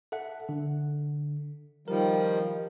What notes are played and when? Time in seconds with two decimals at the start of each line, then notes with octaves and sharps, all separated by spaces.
0.12 A4 E5 F#5
0.49 D3
1.88 D#3 F3 G3 A#4